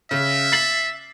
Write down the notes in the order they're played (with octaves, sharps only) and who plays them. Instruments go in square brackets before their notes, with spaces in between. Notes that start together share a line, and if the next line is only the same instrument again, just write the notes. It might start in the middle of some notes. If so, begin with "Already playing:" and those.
[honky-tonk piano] C#3 [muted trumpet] E5
[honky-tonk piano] A6 C7 F#7